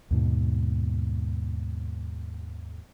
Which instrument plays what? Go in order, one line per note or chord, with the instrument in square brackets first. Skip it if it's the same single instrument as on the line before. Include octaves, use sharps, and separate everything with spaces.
[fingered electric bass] D#2 G#2 B2